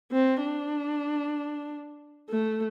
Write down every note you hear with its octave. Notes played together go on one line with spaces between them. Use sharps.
C4
D4
A3